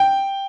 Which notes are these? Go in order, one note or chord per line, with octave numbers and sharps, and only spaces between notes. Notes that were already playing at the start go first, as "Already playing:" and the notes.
Already playing: G5